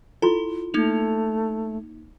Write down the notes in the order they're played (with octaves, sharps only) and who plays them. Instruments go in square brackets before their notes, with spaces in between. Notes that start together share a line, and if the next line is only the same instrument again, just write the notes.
[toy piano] E4 F4 C6 [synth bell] A4
[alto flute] A3 [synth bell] A#3 D#4 F7